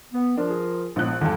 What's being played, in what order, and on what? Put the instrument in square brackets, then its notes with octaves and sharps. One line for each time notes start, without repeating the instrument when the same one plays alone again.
[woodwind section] B3
[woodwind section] F3 F4 A#4 [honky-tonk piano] D4
[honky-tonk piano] G#4
[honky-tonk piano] A#1 F#6 [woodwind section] A2 G#3 B3
[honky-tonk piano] E2 G2 A4 [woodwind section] G#3 C4